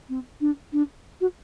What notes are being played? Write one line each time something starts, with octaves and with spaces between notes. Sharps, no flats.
C4
D4
D4
F#4